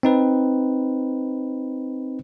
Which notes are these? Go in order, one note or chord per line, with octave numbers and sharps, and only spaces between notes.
C4 D#4 B4